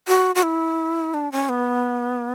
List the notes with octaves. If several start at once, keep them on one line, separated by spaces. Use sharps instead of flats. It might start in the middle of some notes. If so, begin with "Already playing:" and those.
F#4
F#4
E4
D4
C#4
B3